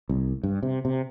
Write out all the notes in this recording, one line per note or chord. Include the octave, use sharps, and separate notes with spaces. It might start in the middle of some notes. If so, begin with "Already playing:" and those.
C2
G2
C3
C3